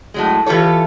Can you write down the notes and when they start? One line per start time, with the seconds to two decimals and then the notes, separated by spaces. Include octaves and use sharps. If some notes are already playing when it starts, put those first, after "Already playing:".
0.14 A2 F#3 G#3
0.46 E3 F4 G4 A4 C#5